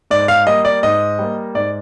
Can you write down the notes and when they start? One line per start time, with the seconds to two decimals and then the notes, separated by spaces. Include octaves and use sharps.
0.11 G#2 D5
0.28 F5
0.47 G3 A#3 D#5
0.65 D5
0.83 G#2 D#5
1.19 G3 A#3
1.55 G#2 D5